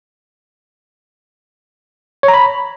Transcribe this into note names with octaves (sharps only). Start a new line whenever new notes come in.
C#5
A#5
B5